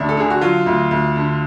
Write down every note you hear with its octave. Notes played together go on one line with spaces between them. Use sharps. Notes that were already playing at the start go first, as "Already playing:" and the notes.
Already playing: D2 D4
A4
D3 G#4
F#4
F#3 F4
D2
D2
D3